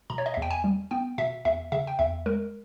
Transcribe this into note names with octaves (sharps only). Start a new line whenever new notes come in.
B2 A#5
C#5
D#5
E2 E5
G5
G#5
G3
B3 G5
B2 E5
E2 E5
C#3 E5
G5
E2 E5
G#3 A#4